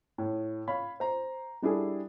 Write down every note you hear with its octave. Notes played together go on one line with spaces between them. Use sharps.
A2
C#5 F5 B5
C5 A#5
G3 D4 E4 G#4 A4